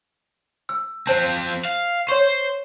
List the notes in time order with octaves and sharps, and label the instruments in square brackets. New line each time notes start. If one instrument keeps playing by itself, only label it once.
[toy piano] E6
[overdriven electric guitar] F3 C4 [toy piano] C5 A5
[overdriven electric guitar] F5
[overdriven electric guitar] C5 [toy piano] C#5 C#6